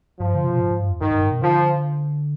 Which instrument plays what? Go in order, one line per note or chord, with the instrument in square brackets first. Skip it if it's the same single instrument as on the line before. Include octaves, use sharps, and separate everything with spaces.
[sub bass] G2 [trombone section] F3
[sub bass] D3
C3
B2
G#2
G#2
G2
F2
[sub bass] G2 [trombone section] D#3
[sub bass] G2
G#2
B2
[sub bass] D3 [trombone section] F3